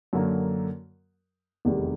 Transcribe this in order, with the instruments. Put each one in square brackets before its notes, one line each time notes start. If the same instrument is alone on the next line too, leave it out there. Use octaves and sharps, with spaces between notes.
[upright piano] F#2 D3 F#3 A#3
F1 E2 C3 D#3 G3